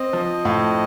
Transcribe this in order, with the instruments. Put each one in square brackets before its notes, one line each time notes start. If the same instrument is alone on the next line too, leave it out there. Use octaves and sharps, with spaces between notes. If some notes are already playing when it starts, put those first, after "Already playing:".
Already playing: [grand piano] C4 [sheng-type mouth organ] D#5
[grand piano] F3
A2